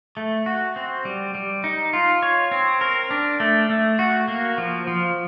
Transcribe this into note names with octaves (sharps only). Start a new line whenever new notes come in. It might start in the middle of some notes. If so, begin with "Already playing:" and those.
A3
F#4
C4
G3
G3
D#4
F4
C#5
C4
A#4
D4
A3
A3
F#4
A#3
F3
F3